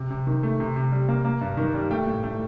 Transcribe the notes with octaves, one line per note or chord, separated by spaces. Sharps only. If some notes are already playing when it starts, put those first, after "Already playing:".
Already playing: C3
C3
D#3
A3
C3
C3
G3
A#3
A#3
G2
D#3
G3
A3 G5
A2
A3